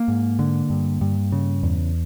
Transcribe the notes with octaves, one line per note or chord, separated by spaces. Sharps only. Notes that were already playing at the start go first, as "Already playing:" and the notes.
Already playing: A#3
G#2
D3
G2
G2
C#3
E2